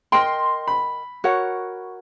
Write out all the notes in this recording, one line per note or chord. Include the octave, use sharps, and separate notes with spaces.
A#4 D#5 G5 C6
B5
F#4 A#4 C#5 F#5